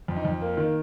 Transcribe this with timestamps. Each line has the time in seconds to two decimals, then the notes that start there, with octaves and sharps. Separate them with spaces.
0.08 F2
0.17 D#4
0.25 F2
0.41 A#3
0.57 D#3